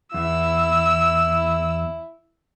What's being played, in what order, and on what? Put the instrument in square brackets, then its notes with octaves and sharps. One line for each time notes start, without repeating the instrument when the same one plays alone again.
[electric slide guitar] E2 [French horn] E4 [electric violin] E6